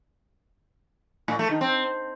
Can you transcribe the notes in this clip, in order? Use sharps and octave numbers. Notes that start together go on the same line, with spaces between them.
A2
A3
D#3
C4